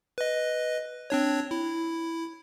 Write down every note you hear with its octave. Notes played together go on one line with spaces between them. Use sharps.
B4 D#5
C4 D4 C#5
E4